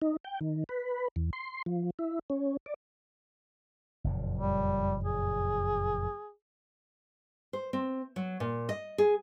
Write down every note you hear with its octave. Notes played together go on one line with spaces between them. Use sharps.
D#4
G5
D#3
B4
E2
C6
F3
E4
C#4
D5
F#1 F2 A#2
G3
G#4
C5
C4
F#3
A#2
D#5
G#4